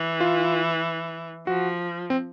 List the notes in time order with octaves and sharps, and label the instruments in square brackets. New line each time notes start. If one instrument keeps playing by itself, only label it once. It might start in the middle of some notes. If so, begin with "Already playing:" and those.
Already playing: [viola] E3
[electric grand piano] F4
[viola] F3 [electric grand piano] F#4
[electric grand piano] C4